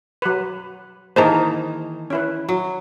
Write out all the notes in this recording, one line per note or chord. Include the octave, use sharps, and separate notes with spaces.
F#3 B4
D#3 E3 A#3 D#4 G#4 C5 A5 A#5
C#4 E4 B4
F#3